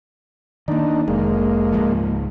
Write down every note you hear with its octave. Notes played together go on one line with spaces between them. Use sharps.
D#3 A#3 D4 D#4
F1 G#3 A#3
C#2 G#2 F3